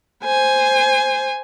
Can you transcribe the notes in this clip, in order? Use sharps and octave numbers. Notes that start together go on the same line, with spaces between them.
C5 G#5